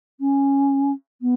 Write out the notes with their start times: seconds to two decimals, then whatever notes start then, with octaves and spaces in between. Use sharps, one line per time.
0.20 C#4
1.21 B3